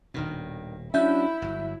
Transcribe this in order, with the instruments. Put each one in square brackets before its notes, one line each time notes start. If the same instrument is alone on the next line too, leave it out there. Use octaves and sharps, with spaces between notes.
[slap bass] D#1 B2 [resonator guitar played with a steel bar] G2 D#3
[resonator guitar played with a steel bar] F#3 D4 [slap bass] C#4 [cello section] E4 [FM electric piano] E5 G6
[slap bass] G1 [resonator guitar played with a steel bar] F#3